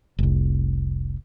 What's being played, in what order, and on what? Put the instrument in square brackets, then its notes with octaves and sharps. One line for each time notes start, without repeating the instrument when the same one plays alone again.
[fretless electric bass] F1 C2